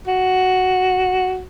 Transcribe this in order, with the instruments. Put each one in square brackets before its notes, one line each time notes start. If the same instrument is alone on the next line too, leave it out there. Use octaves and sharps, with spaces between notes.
[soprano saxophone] F#4